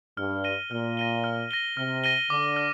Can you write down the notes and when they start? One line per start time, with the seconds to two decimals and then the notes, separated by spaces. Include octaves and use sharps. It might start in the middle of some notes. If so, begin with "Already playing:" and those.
0.17 G2 F6
0.44 A#6 D#7 G7
0.71 A#2 F6
0.97 A#6 D#7 G7
1.24 F6
1.51 A#6 D#7 G7
1.77 C3 F6
2.04 A#6 D#7 G7
2.30 D3 D6
2.56 F6